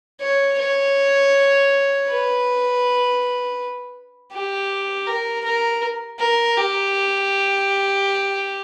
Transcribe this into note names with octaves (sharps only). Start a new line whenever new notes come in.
C#5
C#5
B4
G4
A#4
A#4
A#4
G4